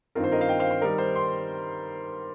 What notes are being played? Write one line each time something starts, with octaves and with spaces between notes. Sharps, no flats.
G2 D#3 C4 F4 A#4
C5
A#4 D#5
C5 F5
D#5 G5
C5 F5
C5
D#3 G3 D#4 A#4
C5
C6